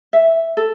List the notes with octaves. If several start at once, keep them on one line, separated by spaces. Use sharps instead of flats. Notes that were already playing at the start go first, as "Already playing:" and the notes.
E5
A4